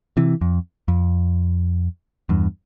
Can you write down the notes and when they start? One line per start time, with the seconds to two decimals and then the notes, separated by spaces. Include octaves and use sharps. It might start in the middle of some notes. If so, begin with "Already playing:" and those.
0.17 C3 E3
0.41 F2
0.88 F2
2.29 E2 G2